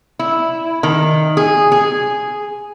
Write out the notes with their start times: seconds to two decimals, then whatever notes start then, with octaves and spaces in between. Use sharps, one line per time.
0.19 E4
0.83 D#3
1.37 G#4
1.72 G#4